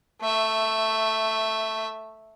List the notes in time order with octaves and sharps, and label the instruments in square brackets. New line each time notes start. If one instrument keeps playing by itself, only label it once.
[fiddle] A3 E5